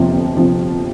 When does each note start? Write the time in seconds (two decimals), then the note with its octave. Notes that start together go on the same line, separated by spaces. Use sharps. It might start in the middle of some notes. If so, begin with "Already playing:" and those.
Already playing: G1 F2 C3 F3
0.13 G1
0.37 C3 F3